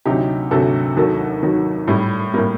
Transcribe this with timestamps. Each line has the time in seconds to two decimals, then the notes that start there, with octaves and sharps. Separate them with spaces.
0.06 D2 C3 F#3 D#4 G4
0.51 D2 C3 F#3 F#4 A4
0.97 D#2 D#3 F#3 F#4 A4
1.43 D#2 D#3 F#3
1.88 A2 G3
2.33 A2 G3 A#3